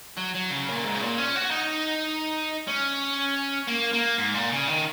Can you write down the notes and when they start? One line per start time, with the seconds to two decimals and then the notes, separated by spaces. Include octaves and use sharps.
0.17 F#3
0.35 F#3
0.51 C#3
0.69 A#2
0.84 G#2
0.95 C#3
1.01 A#2
1.17 C#4
1.35 F#4
1.51 D#4
2.67 C#4
3.67 A#3
3.93 A#3
4.18 G#2
4.34 A#2
4.52 C#3
4.68 D#3